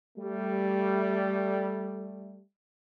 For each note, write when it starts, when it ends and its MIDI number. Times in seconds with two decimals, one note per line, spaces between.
0.18 2.39 55
0.18 2.39 57